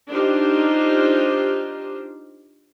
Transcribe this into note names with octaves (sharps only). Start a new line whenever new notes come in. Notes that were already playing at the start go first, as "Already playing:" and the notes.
D4 D#4 F4 G4 C5